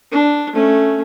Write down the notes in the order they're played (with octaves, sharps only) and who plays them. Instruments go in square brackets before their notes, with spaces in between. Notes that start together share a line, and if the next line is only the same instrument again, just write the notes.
[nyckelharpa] D4
A3 C#4